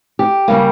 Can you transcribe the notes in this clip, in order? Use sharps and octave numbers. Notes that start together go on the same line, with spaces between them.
G4
C#3 G3 A#3